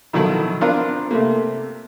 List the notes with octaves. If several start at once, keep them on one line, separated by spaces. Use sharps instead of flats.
B2 D#3 F3 F#3 E4 A4
B3 C4 D4 F4 A#4
C3 A3 A#3